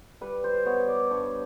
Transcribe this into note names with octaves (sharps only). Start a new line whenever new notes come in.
G3 B4
C5
B3 C#5
D5
G2 C#5